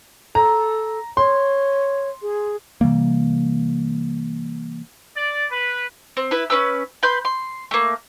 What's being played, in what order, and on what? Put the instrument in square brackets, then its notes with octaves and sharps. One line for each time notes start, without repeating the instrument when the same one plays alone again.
[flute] A4 [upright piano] A#5
[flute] C#5 [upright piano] C6
[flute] G#4
[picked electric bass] C3 E3 G3 A#3
[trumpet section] D5
B4
[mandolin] C4
E4 B4
C#4 E4 B4 E6
B4 B5 C6 G6
C6
A3 A#3